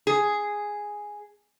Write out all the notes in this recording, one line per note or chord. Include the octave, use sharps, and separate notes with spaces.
G#4